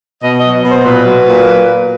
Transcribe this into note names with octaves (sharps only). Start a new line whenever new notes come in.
B2 D#5
D#5
F#3
B2
C5
A#2 B4
F#3
A#2